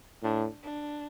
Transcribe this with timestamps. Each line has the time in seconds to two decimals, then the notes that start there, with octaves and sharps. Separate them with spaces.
0.23 A2 D4
0.63 D4